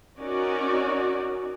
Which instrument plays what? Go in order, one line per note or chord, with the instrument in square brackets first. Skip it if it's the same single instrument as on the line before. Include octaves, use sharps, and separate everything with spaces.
[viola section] C#4 D#4 F#4 A#4 D5